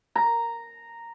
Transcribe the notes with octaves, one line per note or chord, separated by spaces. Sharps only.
A#5